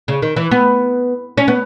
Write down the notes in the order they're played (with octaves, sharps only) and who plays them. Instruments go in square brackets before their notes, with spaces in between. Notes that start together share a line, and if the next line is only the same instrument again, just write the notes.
[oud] C#3
D#3
E3
B3
C#4
B3